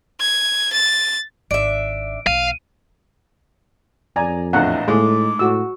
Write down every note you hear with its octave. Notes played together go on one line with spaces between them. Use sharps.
G#6
A6
G#1 D4 E5 D7
B1 F5 D#7
F2 D5 G#5 A#5
A#1 E2 A2 E4 D#5 E5 F#5
A2 G#3 A3 D#4 G#4 D6
A2 F#4 E6